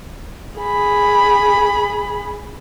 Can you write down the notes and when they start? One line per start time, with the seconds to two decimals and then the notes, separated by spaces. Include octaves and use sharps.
0.59 G#4 B5